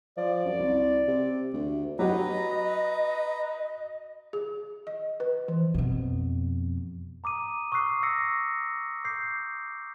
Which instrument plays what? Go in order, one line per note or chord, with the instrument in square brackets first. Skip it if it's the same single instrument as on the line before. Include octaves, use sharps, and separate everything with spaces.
[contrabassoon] F3 [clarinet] D5
[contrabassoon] F#2
C2
C3
D2
[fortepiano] F#3 G4 [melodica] B4 A#5 [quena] D#5
[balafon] G#4
D#5
B4
E3
[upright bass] F2 B2
[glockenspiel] A#5 D6 D#6 D#7
C#6 D#6 E6 F#6 C7
C#6 E6 A#6 C7 C#7
D6 G6 C7